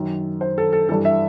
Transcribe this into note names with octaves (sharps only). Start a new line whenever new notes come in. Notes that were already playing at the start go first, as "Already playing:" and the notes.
Already playing: F#2 D#3
C5
A4
A4
G2 E3 A4
E5